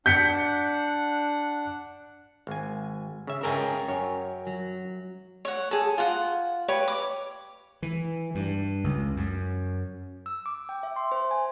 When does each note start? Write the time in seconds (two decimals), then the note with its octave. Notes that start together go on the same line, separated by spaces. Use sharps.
0.06 D4 F#5 G6 B6 C#7
2.47 G#1 G#5
3.27 C#3 E5
3.43 C#2 C#3 A#4 G5 G#5
3.88 F#2 C#5
4.47 F#3
5.45 C#5 F#5
5.71 G#4 A4
5.98 F4 F#5
6.68 G4 B4 C#5
6.88 D6
7.83 E3
8.35 G2
8.84 C#2
9.17 F#2
10.26 E6
10.46 D6
10.69 G5
10.83 E5
10.96 C6
11.12 C5
11.31 G#5